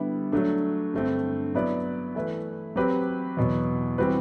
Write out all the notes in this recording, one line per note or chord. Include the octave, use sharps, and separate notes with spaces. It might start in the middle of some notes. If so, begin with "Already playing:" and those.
Already playing: D3 G3 B3 E4
F#3 A3 D4
G2 D3 A3 C4
F#3 B3 E4 B4 D5
E3 A3 E4 B4
F#3 C4 G4 B4
E2 B2 F#3
E3 G3 C4 F#4 B4